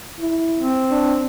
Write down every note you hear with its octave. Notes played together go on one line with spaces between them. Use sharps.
E4
C4
D4